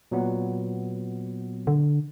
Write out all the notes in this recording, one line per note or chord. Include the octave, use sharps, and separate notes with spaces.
A#2 F#3 B3
D3